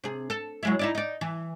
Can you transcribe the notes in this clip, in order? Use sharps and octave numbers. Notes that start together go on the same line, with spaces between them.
C3 G#4
A4
F#3 G#3 E4
D#4 E4 D5
D#4 D5
E3